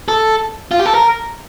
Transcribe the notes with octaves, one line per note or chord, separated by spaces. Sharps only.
A4
F4
G4
A4
A#4